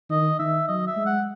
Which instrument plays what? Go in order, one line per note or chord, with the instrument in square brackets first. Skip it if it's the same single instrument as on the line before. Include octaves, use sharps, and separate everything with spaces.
[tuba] D#3 [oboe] D#5
[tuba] D#3 [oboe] E5
[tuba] F#3 [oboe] D#5
[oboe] E5
[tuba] G#3
[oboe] F#5